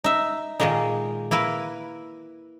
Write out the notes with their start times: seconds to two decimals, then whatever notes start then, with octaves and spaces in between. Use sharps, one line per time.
0.04 D#4 E5
0.60 A#2 D#3 G#3 A#3 D#4
1.31 A#3 E4 A#4 B4